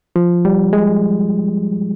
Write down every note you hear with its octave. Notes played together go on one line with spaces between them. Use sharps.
F3
G3
G#3